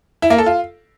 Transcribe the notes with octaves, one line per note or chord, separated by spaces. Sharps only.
E4
A#3
A4
F4